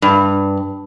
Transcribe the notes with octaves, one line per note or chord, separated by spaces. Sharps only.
G2